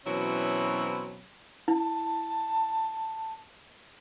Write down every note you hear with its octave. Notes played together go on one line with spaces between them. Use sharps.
B2 E3 F#3 C4 C#4 E4
E4 A5